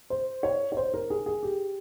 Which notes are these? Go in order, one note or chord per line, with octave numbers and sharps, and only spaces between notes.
C5
C#5
C#5
C5
A#4
G#4
G#4
G4